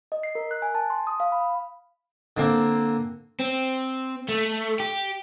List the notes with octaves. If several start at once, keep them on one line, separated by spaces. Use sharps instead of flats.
D#5
C7
A#4
F#6
G#5
A5
C6
D#6
F5
B5
D3 A#3 C4
C4
A3
G4